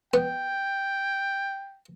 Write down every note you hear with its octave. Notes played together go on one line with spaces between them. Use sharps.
B3 G5